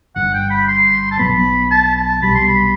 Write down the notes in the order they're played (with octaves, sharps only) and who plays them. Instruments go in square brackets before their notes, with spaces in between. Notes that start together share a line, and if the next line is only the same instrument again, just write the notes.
[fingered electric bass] G1 G2 D3 [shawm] F#5
[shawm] G5
B5
C6
A5
[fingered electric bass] B1 B2 F#3 B3 [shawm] B5
[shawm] A5
A5
[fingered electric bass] C2 B2 G3 [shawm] B5
[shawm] C6
B5